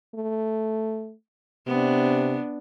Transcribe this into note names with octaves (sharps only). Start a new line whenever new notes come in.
A3
C3 B3 D4